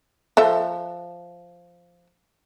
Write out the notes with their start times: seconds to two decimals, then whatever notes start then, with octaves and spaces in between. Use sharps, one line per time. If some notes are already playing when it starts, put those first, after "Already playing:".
0.37 F3 A4 E5